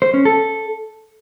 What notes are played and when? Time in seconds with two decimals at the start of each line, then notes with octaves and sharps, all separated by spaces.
0.02 C5
0.14 C#4
0.25 A4